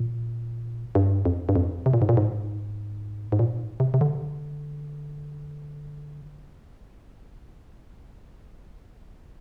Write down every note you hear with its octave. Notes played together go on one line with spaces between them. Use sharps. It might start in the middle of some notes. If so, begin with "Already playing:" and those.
Already playing: A#2
G2
F2
G2
F2
C3
A#2
G#2
A#2
G#2
G#2
A#2
C3
C3
D3